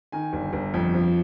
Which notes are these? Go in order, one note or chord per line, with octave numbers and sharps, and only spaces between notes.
D#3 G#5
G1
G1
F2
F3